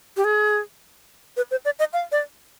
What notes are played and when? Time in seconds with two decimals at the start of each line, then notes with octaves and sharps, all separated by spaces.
0.17 G4
0.24 G#4
1.37 B4
1.51 C5
1.65 D5
1.79 D#5
1.93 F5
2.12 D5